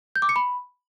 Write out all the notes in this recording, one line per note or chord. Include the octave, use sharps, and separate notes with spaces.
G6
D6
C#7
B5